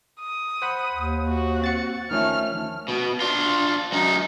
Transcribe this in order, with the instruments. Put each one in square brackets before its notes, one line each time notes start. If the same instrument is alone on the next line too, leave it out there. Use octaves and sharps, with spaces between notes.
[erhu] D#6
[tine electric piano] C5 F#5 B5
[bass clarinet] D#2
[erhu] F#4
[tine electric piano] C4 A6 C#7
[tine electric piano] D#3 F3 C#4 [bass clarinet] A3 [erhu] F6
[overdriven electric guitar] B2
D4 F4
F#2 D#4